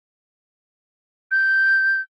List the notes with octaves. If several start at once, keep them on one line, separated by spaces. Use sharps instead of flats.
G6